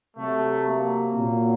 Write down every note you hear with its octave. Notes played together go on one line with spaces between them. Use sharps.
C3 F#3 A3
A#3
A#2 F#3